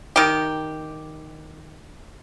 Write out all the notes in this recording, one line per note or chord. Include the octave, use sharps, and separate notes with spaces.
D#3 G4